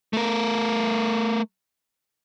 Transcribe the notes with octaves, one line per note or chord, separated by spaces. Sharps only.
A3 A#4